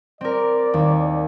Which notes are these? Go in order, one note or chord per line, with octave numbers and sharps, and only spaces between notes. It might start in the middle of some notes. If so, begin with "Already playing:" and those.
C4 A#4 D5
D#2